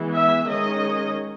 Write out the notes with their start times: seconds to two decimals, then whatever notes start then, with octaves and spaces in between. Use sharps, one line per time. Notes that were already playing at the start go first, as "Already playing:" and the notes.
Already playing: E3 G#3 B3
0.14 E5
0.46 D#3 G#3 C#4 D#5